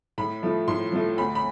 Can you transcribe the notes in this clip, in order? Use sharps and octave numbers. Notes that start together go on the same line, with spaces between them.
A2 B5
F3 A3
A2 C6
F3 A3
D2 B5
B5